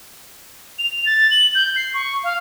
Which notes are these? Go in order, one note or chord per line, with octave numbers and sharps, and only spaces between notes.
F7
A6
F#7
G6
C7
C#6
F5